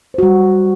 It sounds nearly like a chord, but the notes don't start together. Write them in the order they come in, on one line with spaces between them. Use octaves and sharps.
C5 F#4 G3